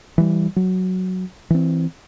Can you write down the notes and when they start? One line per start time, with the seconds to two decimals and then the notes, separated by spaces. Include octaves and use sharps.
0.18 E3 G3
0.56 F#3
1.50 E3 C4